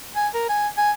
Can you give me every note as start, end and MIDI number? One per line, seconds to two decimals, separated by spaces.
0.16 0.28 80
0.34 0.46 70
0.49 0.68 80
0.78 0.92 80